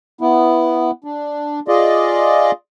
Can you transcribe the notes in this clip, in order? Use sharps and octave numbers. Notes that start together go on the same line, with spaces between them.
B3 E4
D4
F4 G#4 D5 D#5